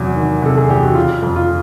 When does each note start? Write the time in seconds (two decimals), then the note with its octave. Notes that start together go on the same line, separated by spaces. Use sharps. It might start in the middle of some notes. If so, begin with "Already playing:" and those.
Already playing: E2 C3 F#3
0.16 D#3
0.42 C3 A4
0.57 G#4
0.69 E2 G4
0.83 F#4
0.95 C#3 F4
1.22 F2
1.36 F4